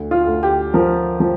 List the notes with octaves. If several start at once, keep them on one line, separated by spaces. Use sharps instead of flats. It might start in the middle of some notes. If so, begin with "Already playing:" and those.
Already playing: D2
F4
D2
G4
F3 A#4
F3